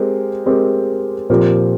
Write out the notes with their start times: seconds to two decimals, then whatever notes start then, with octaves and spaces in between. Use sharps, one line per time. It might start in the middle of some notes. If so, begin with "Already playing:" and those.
Already playing: G#3 C4 G4 A#4
0.46 G#3 C4 G4 A#4
1.30 A#2 F3 C4 G4 A#4